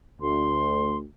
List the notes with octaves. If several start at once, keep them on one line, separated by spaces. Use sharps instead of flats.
D2 C6